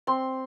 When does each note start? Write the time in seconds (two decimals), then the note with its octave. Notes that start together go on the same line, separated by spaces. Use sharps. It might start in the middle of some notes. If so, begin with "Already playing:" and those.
0.07 C4 C6